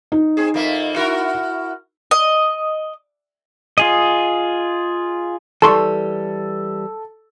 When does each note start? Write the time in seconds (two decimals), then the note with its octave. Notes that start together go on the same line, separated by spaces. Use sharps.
0.12 D#4
0.37 C4 G#4
0.54 F2 A#3 E5
0.96 E4 F#4 A#4
2.11 D#5
3.78 F4 G#4 D#5
5.62 E3 G3 A4 A5 C6 C#6